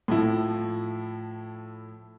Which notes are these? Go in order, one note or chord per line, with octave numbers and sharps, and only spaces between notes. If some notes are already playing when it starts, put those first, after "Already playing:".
A2 F3 E4